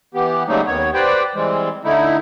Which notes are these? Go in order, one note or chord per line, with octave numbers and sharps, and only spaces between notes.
E3 B3 G4
C#3 F#3 G3 A3 A#3 D#4
D#2 D#3 B3 C#5
G4 B4 C5 D5 G5
E3 G3 G#3 C4
D3 A3 D#4 E4